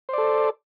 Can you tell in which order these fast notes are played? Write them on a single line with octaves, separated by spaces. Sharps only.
C5 D5 A4